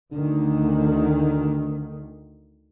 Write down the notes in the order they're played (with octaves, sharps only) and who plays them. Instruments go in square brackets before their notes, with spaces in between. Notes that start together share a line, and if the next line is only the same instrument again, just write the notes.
[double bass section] D2 D#3 [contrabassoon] D3